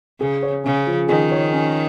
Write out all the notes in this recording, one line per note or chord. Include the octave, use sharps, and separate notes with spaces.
C#3 G#4
C#5
C#3 C#4
F3
D#3 G#4
C#5
C#4